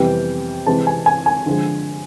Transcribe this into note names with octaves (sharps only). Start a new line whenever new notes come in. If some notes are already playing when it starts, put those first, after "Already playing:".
Already playing: F2 C3 E3 G3 B3 G5
C3 E3 G#3 C4 A5
G#5
G#5
G#5
D3 F3 G#3